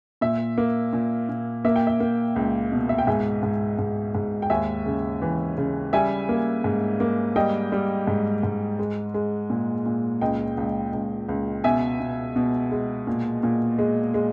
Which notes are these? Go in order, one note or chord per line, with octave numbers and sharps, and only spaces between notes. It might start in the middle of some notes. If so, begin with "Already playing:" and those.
A#2 E5
A#3
A#2
A#2
A#3 E5
G5
E5
A#3
C#2
B2
E5
G5
G#2 E5 G#5
G#2
G#2
G#2
G5
D#2 E5 G#5
C#3
E3
C#3
G3 E5 G#5
A#3
G#2
A#3
G3 D#5 G5
G3
G#2
G#2
G#3
G#3
A#2
A#2
C#2 D#5 G5
C#2
C#2
C#2
B2 E5 G#5
B2
B2
G#3
A#2
A#2
G#3
G#3